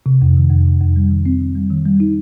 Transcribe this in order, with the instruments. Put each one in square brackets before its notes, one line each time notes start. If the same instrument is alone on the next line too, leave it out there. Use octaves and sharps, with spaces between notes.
[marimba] C3
F2
D#3
F2
C3
F2
G3
D#3
C4
D#3
G3
D#3
G3
D#4